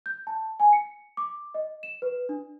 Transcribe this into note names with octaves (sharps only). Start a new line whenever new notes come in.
G6
A5
G#5
C#7
D6
D#5
E7
B4
D4